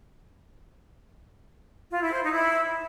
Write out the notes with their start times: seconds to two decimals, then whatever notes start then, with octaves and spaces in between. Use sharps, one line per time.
1.91 F4
2.01 E4
2.12 C5
2.23 D#4
2.33 E4